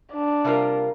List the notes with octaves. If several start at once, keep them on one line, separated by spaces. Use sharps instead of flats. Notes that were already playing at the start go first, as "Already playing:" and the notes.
D4
C3 G3 A#3 F4 A#4